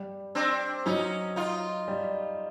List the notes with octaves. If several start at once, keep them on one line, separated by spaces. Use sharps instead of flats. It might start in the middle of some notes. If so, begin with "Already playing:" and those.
Already playing: G3
C4 D4
F#3 C#4 D#4
D#4 F4
G3